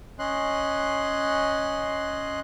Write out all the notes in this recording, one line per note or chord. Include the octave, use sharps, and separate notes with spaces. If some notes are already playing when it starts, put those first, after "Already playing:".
C#4 D#5 C6 F#6